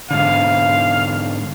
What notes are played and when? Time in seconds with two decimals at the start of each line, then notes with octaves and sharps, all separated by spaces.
0.11 G#2 D3 F5